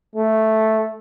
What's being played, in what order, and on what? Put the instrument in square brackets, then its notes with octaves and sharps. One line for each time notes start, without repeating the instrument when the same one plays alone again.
[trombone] A3